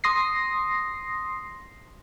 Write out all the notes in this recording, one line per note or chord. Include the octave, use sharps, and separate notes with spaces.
C6 D#6 A#6 C7